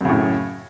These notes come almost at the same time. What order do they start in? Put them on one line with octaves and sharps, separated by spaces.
F#2 C#3 A2